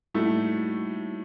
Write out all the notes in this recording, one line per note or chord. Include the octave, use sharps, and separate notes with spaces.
A2 G3 A3 A#3 D#4 F#4